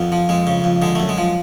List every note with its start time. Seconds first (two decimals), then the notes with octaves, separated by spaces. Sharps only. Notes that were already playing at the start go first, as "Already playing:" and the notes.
Already playing: F2 B3
0.12 F3
0.29 F2 G#3
0.47 C#3
0.64 F2
0.82 D3 G#3
0.95 F#2 A3
1.09 G#3
1.18 F3